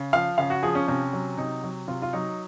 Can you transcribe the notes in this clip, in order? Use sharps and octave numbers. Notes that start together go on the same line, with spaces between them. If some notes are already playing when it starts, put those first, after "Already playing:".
Already playing: C#3
F3 F5
C#3 F5
F#4
F3 G#4
C#4
C3 C#4
F#3
C3 D#4
F#3
C3 F4
F4
F#3 D#4